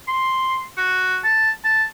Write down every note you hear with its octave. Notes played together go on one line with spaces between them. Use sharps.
C6
F#4
A5
A5